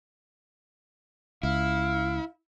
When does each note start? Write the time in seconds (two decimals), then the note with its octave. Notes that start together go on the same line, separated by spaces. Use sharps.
1.43 C#2 E4 F5